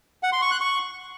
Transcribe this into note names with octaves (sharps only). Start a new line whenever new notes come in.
F#5
C6
C#6
F#6
C#6